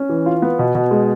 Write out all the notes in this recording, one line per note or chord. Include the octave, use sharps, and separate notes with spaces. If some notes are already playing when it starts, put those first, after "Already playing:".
Already playing: C#4
E3
F4
B3
B2
B2
G#3